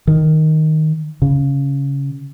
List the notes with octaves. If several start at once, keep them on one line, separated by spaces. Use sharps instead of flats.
D#3
C#3